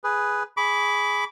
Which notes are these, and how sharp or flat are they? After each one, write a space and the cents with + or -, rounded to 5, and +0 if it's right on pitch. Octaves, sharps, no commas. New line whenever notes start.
G#4 +0 B4 +0
G#4 +0 B5 +0 D6 -30